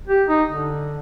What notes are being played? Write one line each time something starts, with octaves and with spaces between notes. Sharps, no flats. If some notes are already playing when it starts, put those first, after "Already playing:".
G4
D#4
D3